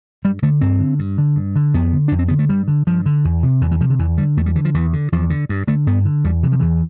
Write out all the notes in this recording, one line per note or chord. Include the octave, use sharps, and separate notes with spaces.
G2 G3
D3 A3
G2 C4
D3
G2
D3
G2
D3
F2 B3
D3
F2 D4
C4
D3 B3
A3
G2 G3
D3
G2 F3
D3
E2
C3
E2 E3
E3
C3 F3
D3
E2 E3
D3 G3
E2 A3
G3
D3 E3
F3
E2 E3
D3
E2 F3
D3
G2
D3 A3
G2 B3
D3
E2 G3
C3 E3
F3
E2 E3